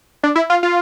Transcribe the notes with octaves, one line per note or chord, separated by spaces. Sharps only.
D4
E4
F4
F4